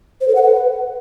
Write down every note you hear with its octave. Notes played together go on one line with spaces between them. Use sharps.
C5
A4
F#5
B4